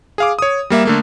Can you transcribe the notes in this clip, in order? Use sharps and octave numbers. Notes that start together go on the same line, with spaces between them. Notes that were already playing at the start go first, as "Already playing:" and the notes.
G#4 F5 D6
C#5 D#6
G3 A#3 E5
D3 A3 A#3